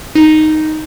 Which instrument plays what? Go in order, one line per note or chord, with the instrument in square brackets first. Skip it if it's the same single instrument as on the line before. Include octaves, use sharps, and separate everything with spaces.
[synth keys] D#4